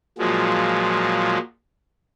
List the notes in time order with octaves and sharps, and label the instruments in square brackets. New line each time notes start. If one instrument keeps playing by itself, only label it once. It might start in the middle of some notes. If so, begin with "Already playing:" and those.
[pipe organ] A#2 F3 F#3 G#3